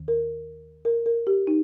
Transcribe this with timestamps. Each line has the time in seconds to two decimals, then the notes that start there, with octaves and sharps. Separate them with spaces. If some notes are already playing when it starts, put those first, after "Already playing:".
Already playing: D#2 D#3
0.08 A#4
0.85 A#4
1.06 A#4
1.27 G4
1.47 D#4